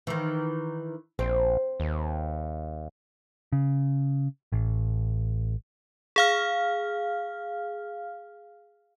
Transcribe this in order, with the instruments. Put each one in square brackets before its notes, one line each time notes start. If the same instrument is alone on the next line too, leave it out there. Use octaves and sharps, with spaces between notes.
[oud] D#3 E3
[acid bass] A#1 [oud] C4
[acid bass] D#2
[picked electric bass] C#3
A1
[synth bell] G#4 F5 F6